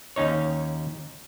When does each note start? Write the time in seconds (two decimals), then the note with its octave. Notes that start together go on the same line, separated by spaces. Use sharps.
0.16 D#2 C#4 D#4 C#5